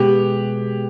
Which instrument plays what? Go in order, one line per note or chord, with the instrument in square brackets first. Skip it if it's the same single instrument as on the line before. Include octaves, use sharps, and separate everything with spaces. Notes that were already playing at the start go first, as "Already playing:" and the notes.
Already playing: [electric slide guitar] B2 G#3 B3 [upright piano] G4